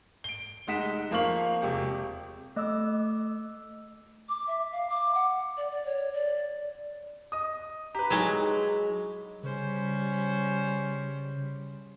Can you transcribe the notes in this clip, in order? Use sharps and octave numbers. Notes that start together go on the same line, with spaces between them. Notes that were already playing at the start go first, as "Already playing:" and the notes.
D7 G7
F1 G#3 D#4 F#5 B6 E7
F2 F3 A#3 F5 C#6 F#7
E1 C3 G4 C#6
A3 D#5 D6 E6
D6
E5
F5
D6
F#5
D5
D5
C#5
D5
D#5 D#6
G4 B4 A#5
F#3 G#3 D#4 E4
C#3 G3 C#4 C5